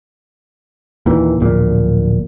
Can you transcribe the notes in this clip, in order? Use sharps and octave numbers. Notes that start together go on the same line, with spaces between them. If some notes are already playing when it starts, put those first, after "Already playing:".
D#2 A#2 E3
D1 A#1 A#2